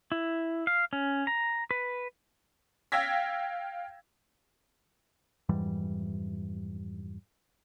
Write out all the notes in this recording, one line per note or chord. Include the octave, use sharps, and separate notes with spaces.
E4
F5
C#4
A#5
B4
F5 G5 E6 G#6 A#6 B6
F2 G#2 E3 G3